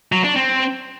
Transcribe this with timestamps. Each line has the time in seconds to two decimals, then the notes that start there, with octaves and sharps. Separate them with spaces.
0.12 F#3
0.24 D4
0.36 C4